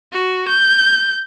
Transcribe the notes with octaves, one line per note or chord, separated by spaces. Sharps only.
F#4
G6